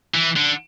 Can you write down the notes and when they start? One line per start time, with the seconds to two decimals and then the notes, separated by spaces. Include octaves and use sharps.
0.15 E3
0.37 D3